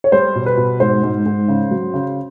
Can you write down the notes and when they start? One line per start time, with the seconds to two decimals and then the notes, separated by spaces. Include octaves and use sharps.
0.04 C#5
0.12 G3 C5
0.35 B2
0.46 B4
0.57 B2
0.80 G#2 C5
1.03 G#2
1.26 G#2
1.48 C#3
1.71 F#3
1.94 C#3